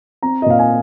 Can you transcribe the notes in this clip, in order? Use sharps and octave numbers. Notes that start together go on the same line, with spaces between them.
C4 A#5
D#5
A#2 F5
G#5